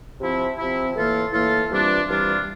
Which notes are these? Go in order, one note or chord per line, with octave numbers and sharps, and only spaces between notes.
C3 F3 C4 E4
C3 F3 C4 E4
A2 E3 A#3 F4 A4
A2 E3 A#3 F4 A4
C3 E3 G3 D4 F4
C3 E3 G3 D4 F4